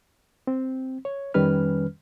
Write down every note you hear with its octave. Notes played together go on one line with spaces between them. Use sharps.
C4
C#5
F2 D#3 G3 C#4 B4 F6